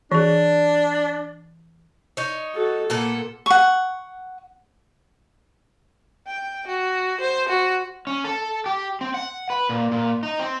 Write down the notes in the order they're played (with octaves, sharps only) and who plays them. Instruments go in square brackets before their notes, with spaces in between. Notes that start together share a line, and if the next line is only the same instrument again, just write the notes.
[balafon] E3 G#4 [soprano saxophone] D4
[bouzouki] D#4 C#5
[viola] F#4 A4
[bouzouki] A#2 B3 A4 [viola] A#3
[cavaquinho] F#5 C#6
[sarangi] G5
F#4
C5
F#4
[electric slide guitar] C#4
A4
G4
C4
F#5
B4
A#2
A#2
D#4
C4